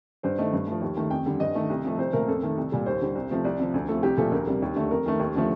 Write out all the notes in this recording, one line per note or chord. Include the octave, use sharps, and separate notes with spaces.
G2 C5
D#3 A3 D#5
G2
F3 A3
D#2
D#3 A3
F2 G5
D3 G3
G2 D#5
D#3 A3
C2
C3 F3 A3
C2 C5
A#2 A3 A#4
F2 A4
D#3 A3
C2
A#2 G3
D#2 C5
D3 G3
C2
C3 F3 A3
C2 D5
C3 F3
D2
C3 F3 A3 A4
C2 G4
A#2 F3 A3 A4
D2 A#4
C3 G3
D#2
D3 A3
F2 A#4
D#3 A3
D#2
D3 F3 A3